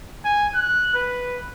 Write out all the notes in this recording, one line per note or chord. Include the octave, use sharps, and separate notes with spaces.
G#5
F#6
B4